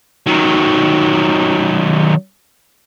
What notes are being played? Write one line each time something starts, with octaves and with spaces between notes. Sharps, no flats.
D#3 F#3